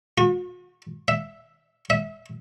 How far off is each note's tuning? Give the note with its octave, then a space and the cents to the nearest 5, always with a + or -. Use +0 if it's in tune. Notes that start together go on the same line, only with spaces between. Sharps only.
F#4 -45
E5 +0
E5 -25